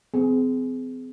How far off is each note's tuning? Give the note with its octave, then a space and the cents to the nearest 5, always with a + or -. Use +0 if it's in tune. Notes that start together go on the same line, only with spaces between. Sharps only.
C4 -40 G#4 +20